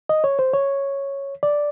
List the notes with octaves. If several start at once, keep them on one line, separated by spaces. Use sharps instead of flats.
D#5
C#5
C5
C#5
D5